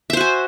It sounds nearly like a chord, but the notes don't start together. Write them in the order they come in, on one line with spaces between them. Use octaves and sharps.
E5 C5 F#4 G#5